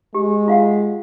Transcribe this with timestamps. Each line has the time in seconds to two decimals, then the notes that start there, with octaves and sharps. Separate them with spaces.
0.14 G#3 G4
0.48 F4 F5 F#5